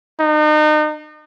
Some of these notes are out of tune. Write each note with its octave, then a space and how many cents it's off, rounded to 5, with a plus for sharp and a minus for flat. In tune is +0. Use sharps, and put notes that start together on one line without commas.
D#4 -35